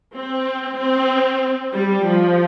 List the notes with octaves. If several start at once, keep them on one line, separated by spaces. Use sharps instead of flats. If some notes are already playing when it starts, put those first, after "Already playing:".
C4
C4
G3
F3